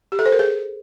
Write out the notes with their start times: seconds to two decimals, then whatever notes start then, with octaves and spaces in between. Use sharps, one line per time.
0.12 G4
0.19 A4
0.26 C5
0.32 A#4
0.39 G#4